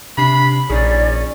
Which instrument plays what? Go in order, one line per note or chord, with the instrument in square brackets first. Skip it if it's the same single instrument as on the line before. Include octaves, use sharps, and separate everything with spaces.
[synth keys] C3 D4 C7 [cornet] B5
[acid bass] A#1 [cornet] C#4 [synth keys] D#4 G#4 [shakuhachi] D5